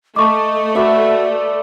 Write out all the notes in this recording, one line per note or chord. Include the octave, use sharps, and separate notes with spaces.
A3 D#5 A5 C#6 D6
F#4 B4 D5 E5